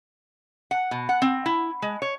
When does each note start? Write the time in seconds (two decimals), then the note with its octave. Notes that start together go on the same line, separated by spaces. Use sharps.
0.71 F#5
0.91 B2
1.09 F#5
1.22 C4
1.46 E4
1.82 G#3
2.02 C#5